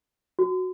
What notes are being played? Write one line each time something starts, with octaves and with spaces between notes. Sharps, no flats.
F#4